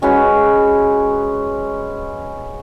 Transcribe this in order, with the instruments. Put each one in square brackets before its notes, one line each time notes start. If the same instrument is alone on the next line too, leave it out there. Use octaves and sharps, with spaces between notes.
[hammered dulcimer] G#3 C#4 F#4 B4